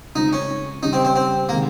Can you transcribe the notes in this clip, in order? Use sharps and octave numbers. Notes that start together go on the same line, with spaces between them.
C#3 G#3 C4 D#4 F4
C#4
C#3 G3 C#4 D#4
C4
C4
C4
C3 D#3 G#3 A#3